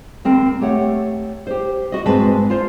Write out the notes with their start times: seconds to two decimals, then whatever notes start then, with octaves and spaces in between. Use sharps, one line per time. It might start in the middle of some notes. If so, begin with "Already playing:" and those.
0.25 D#2 C4 A#4
0.61 A3 G4 C#5 F#5
1.47 G4 C5
1.92 F#4 D#5
2.06 G#2 G#3 C4 B4 C5 A5
2.50 F4 C5